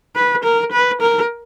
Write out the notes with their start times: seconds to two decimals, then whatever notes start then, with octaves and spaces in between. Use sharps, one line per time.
0.16 B4
0.44 A#4
0.72 B4
1.01 A#4